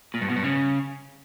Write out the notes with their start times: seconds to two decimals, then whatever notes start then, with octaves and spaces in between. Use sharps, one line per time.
0.14 A#2
0.21 G2
0.29 B2
0.36 G2
0.43 C#3